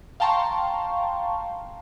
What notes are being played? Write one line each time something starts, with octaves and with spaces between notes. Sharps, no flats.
F5 G5 A5 A#5 C6 C#6